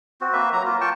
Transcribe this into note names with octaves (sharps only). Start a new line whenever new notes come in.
C4 F#4
A#3 B4 E5
F#3 A#5
A#3 F4
F4 G5 A5 C#6